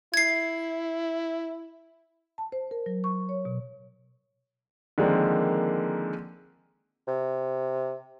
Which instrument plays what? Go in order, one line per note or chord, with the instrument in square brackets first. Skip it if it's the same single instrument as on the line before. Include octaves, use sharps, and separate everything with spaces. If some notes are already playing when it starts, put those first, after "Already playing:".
[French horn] E4 [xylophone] G#6 C7
[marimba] A5
C5
A#4
F#3
C#6
C#5
B2
[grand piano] D3 D#3 F3 G#3 A#3 C4
[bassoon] C3